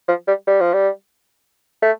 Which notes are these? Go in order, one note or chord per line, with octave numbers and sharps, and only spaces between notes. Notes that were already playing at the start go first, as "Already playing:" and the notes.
F3
G3
G3
F3
G3
A3